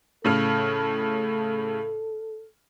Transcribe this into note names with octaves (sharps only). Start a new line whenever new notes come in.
A2 C#3 A4 F6